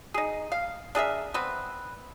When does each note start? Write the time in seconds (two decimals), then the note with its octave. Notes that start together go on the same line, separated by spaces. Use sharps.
0.14 D#4 G#4
0.52 F5
0.95 D4 G#4 A#4 E5
1.34 B3 C4 B4